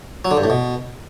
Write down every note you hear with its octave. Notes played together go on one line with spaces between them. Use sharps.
F#3
D3
G2
A2
B2